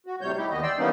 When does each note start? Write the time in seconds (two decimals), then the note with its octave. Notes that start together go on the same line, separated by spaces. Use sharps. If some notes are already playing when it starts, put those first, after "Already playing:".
0.06 F#4
0.21 A2 C3 G3 C#5 G6
0.38 D#4 E4 G4
0.51 D#2 D#3 E3 B3 D#5
0.63 D5 G5 C6 E6
0.78 E3 G3 A#3 B3 C#4 D#4